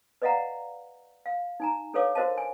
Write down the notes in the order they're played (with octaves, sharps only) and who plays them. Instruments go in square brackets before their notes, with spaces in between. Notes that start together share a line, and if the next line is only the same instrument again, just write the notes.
[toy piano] B4 D5 D#5 F5 F#5 A#5
F5
D#4 G#5 A#5
D4 A4 B4 C#5 F5 D6
F#4 A#4 C5 D#5 F5 A5
G#5